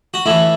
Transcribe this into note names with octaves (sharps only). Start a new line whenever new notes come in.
F#4
A2 E3 E4